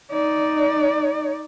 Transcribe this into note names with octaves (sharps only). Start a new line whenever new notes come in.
D#4 D5